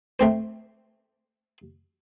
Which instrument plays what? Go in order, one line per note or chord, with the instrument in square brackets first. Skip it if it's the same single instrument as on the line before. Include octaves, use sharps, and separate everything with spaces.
[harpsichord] A3 C4 C5